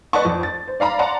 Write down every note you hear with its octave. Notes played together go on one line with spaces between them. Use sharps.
B4 D5 D#5 F#5 A5 C#6
F2
A6
C5
D5 F5 A#5 B5
D5 F#5 A5 A#5 C6